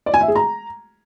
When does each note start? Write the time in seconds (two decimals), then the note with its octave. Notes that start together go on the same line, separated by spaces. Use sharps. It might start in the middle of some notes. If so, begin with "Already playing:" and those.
0.06 D5
0.14 G#5
0.21 E5
0.28 G#4
0.35 A#5